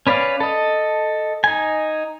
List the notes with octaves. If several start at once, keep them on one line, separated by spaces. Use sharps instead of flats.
C#4 B4 D5 F5
A4 D#5
D#4 G#5